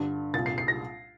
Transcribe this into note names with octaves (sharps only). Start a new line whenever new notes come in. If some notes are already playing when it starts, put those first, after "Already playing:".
Already playing: G2 D3 A6
C2 A#2 A6
C7
C7
A#6